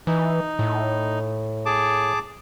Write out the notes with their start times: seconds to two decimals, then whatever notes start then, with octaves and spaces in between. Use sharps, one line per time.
0.07 E3 D#4
0.59 A2
1.66 G#4 A5 D6